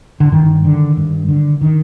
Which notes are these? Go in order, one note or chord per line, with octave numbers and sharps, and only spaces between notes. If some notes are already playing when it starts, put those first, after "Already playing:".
D3
G2 D#3
D3
G2
D3
D#3